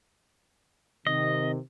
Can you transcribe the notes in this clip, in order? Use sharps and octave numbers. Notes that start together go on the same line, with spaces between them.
C3 D#3 D#5